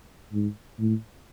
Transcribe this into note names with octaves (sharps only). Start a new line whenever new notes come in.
G#2
A2